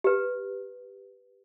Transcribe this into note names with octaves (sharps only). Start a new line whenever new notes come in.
G4 B4